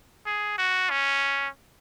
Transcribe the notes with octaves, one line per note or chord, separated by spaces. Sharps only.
G#4
F#4
C#4